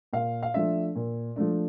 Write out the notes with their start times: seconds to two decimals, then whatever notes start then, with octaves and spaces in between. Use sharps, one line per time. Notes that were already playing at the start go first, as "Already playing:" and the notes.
0.13 A#2 F5
0.43 F5
0.54 F3 A3 D4 E5
0.96 A#2
1.36 F3 A3 D4